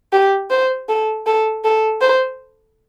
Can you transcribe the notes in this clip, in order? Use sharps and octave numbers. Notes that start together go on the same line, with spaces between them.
G4
C5
A4
A4
A4
C5